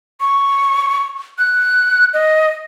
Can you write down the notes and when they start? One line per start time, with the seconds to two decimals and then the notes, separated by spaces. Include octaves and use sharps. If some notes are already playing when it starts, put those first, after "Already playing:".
0.21 C#6
1.39 F#6
2.14 D#5